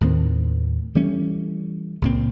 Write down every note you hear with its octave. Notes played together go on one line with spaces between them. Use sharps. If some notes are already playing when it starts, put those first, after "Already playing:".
D#2 A2 D#3 C4
E3 G3 A3 C#4
C#2 A#2 C4